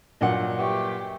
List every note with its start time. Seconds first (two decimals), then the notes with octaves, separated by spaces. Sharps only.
0.21 G2 A#2 F#3 D#5 F#5 G#5
0.58 G4 B4 E5 C#6